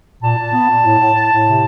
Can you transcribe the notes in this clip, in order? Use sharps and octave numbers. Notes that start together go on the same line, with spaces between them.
A#2 A5
A#2
B3
A#2
A2
A2
A2
A2
C3